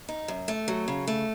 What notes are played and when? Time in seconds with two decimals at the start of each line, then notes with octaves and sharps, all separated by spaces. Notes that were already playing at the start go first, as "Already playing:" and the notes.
0.09 D#4
0.28 F#2
0.48 A3
0.68 F#3
0.88 C#3
1.07 A3